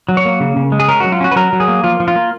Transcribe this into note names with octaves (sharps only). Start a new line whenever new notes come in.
F#3
C#5
A#3
C#3
C#3
G#3
G#4
C#4 A#4
F#3 F#4
F4
C#4 F#4
B4
F#3 A#4
F#3
G#4
A#3
F3 F4
F3
F4
A#3